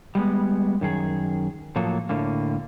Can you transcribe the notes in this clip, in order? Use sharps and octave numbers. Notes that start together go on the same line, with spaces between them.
G3 G#3 B3
F#2 D#3 G#4
A2 F3 F#3 A#3 A4
A2 D3 A#3